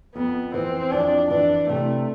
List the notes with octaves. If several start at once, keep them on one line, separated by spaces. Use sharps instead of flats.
F2 B3
E3 C4
F2 D4
E3 D4
C3 A3